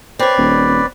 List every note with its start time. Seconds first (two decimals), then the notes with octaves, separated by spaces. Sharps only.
0.19 C4 B4 C#5 D5
0.38 D#1